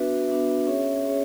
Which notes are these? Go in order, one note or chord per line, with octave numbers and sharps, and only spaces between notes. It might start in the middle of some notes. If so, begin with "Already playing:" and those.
Already playing: B3 D4 F#4 B4 E5
B3 D4 F#4 B4 E5
C#4 G#4 C#5 E5
C#4 G#4 C#5